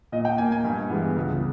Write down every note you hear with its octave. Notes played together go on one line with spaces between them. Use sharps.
A#2 D#5
G5
A#3 G#5
G#5
G2
E3 G#3 B3
C#2